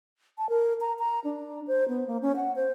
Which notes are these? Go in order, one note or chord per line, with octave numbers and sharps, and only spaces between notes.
A5
A#4
A#5
A#5
D4
C5
B3
A#3
C#4
F#5
C5